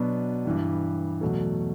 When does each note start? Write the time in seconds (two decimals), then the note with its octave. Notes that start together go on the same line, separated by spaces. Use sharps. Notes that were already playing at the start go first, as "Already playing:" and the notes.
Already playing: B2 F#3 B3 D4
0.45 G2 E3 G3
1.21 E2 B2 F#3 A3